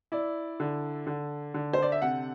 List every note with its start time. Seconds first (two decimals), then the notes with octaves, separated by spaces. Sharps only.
0.12 E4 D5
0.60 D3
1.07 D3
1.54 D3
1.73 C5
1.82 D5
1.92 E5
2.02 C3 F#5